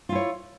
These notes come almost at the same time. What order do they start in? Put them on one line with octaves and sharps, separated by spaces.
F4 E4 C#5